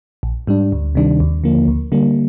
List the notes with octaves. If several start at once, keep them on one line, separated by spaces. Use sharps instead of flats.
A#1
G#2 G3 D4
D2
C3 D#3 G3 D4
D#2
D3 F3 A#3
D2
D3 G3 A#3